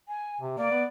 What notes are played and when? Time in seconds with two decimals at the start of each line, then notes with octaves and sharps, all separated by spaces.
0.08 G#5
0.41 C3
0.58 A#3 D5
0.71 B3